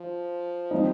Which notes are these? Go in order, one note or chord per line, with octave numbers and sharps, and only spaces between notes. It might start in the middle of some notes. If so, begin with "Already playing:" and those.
Already playing: F3
G3 C4 D#4